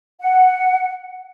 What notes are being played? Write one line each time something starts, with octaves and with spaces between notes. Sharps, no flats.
F#5